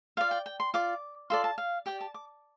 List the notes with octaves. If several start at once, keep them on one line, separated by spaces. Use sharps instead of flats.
F4 D5 F5
G5
G5
C6
F4 D5 D6
F4 A4 D5 C6
A5
F5
G4 D5 G5
A5
D6